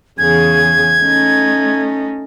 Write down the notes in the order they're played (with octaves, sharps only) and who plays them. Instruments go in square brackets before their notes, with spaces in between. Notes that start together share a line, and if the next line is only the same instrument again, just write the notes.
[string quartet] E2 C#3 G#4 [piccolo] G#6
[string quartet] A3 C#4 D#4